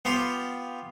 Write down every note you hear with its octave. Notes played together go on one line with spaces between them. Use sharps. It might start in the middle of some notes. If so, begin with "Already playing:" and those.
B3 F4 G4